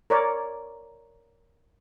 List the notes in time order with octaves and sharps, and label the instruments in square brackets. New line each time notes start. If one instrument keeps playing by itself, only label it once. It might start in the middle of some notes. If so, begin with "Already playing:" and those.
[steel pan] A#4 C#5 D5